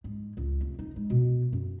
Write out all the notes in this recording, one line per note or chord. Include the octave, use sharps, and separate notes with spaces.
G#2
C#2
F1
D#4
G#3
B2
F#2